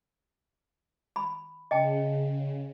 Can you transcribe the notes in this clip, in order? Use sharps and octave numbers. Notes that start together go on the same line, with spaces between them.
B5
C#3 D#5 G5 A5